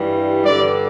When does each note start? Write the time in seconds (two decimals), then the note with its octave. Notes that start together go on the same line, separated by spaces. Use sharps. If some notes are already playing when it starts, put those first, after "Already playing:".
Already playing: G2 E3 G3
0.44 G2 D3 G3 D5